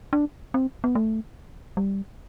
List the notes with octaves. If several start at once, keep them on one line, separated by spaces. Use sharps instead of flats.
D4
C4
B3
A3
G3